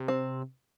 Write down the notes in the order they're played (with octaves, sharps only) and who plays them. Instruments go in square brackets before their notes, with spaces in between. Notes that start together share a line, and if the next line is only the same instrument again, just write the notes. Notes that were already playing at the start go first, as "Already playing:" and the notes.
Already playing: [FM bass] C3
[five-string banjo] C4